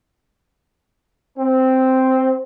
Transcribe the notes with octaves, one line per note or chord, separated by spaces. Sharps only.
C4